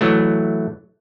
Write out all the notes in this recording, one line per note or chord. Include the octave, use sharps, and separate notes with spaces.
E3 F#3 A3